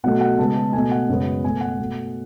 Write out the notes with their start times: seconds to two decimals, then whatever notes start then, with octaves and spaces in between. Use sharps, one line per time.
0.04 B2 F#3 A3 F#5
0.21 F#5
0.38 C#3 G#3 B3 A5
0.56 A5
0.73 B2 A3 G#5
0.92 F#5
1.09 F#2 C#3 G#3 B3
1.44 B2 A3 G#5
1.61 F#5
1.79 B2 A3